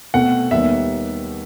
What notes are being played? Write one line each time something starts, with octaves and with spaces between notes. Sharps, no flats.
B2 A3 C4 F#5
D#2 D#3 G3 B3 D#4 E5